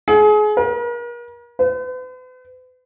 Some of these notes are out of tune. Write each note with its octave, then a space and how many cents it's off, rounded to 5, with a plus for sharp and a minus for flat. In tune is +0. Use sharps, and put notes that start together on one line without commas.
G#4 +30
A#4 +40
B4 +45